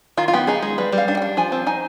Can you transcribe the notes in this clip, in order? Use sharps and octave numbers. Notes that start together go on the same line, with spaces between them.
D#3 F4
F4
B3 G4
D#4 G#4
G#3 G#4
G3 B4
G3
F5
D4
G5
D4
F3 G#5
C4
D#4 G#5